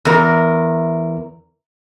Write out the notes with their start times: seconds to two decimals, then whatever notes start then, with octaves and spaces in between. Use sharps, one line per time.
0.05 E2 A#4